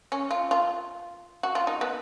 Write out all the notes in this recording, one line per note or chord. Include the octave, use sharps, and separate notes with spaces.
C#4
F4
F4
F#4
F4
D#4
B3